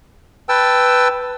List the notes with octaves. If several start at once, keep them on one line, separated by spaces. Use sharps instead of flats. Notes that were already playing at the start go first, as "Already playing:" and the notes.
B4 G5 A5 E6